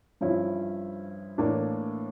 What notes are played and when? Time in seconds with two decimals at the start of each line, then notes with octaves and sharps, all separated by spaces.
0.21 G2 F3 C#4 E4
1.38 A2 E3 A#3 D4